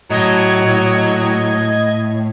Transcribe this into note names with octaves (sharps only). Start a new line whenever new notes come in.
A2 F#3 D#5 G#6